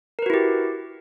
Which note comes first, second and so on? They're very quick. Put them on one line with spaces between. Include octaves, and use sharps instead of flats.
A#4 B4 F#4 E4 G4